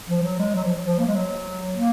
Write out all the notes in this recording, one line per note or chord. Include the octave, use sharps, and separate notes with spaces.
F3
F#3
G#3
F#3
F3
F3
A#3
G#3
F#3
A#3